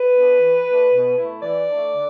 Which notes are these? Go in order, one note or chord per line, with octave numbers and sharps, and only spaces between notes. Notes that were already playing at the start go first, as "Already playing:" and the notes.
Already playing: B4
B3 D4
E3
A3 D4
B2
A3 E4
E3 D5
A3 D4
D3